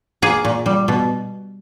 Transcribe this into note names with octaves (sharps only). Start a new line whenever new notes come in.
A#3 G#4
A#2
G3
B2